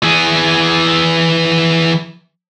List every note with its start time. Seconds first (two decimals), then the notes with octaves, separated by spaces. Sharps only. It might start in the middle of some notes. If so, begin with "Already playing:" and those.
0.03 E3 G#4